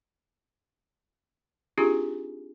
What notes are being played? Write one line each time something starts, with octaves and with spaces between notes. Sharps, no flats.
C4 D4 D#4 F4 G4 G#4